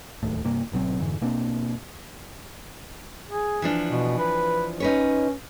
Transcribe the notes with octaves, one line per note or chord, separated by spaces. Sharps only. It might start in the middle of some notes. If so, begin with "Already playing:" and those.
D1 D#2 A2
G2 C3 A#3
G#1 B2 F#3 C4
F2 G#2 D3 E3
B2 A#3 C4 D4
G#4
E3 F3 D4
B2
B4
C#4 D#4 B4 C#5